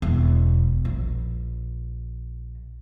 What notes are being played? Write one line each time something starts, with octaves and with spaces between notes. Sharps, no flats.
E1
A#1